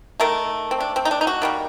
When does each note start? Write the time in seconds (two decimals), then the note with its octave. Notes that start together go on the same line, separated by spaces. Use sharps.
0.20 D#3 A3 A#4
0.71 C4
0.80 D4
0.96 C4
1.05 D#4
1.11 D4
1.21 D#4
1.27 F#4
1.42 D#3 G3 A#3